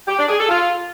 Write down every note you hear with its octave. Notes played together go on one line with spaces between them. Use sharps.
G4
D4
G#4
A4
F4